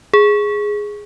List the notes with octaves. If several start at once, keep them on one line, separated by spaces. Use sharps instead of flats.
G#4